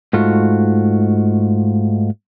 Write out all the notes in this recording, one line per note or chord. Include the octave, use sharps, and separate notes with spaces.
G#2 A3 F4 F#4